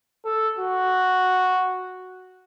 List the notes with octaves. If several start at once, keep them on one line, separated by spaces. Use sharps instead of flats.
A4
F#4